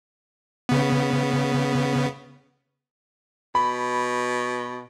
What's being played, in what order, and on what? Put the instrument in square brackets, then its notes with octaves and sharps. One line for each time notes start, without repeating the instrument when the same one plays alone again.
[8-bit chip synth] C#3 B3
[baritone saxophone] B2 [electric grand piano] B5